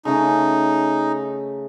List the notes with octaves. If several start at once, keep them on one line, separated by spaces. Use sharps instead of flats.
C#3 A3 C#4 D#4